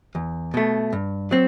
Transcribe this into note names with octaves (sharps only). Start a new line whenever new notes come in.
E2
B2 A3
G2
F#3 C4